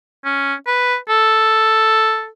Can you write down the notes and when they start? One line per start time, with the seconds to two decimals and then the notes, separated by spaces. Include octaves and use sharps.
0.25 C#4
0.67 B4
1.09 A4